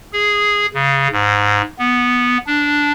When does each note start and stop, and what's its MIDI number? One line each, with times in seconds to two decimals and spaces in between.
0.13 0.66 68
0.74 1.08 49
1.12 1.62 44
1.79 2.38 59
2.46 2.92 62